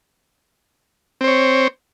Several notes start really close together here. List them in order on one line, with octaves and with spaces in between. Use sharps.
C4 C5 C#5